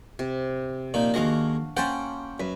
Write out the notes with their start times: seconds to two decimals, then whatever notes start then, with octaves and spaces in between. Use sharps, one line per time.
0.19 C3
0.94 A#2 F3 D#4
1.14 D#2 G#3 D4 F#4 D#5 F5
1.77 A#3 C#4 C5 F#5 G5 A5
2.40 F#2 B4